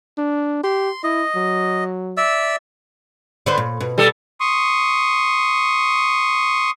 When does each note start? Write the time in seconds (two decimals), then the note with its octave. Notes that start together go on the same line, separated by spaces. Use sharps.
0.18 D4
0.64 G4 C6
1.03 E4 D#5
1.36 F#3
2.17 D5 E5 E6
3.46 D3 B4 C5
3.57 A#2
3.80 B2
3.98 G3 A4
4.40 C6 C#6 D#6